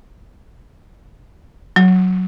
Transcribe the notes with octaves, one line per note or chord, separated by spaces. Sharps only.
F#3